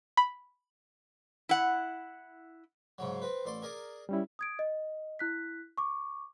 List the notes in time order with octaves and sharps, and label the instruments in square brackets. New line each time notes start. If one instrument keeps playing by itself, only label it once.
[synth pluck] B5
[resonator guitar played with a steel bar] E4 F#5
[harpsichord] G#2 C#3 F#3
C4 B4
A1 D5 C6
G#4 A#4 D5
[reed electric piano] G3 C#4 E4
[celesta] D#6 G#6 D7
D#5
E4 F#6 B6
C#6 D6